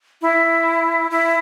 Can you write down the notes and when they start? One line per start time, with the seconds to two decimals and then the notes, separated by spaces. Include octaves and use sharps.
0.22 E4
1.11 E4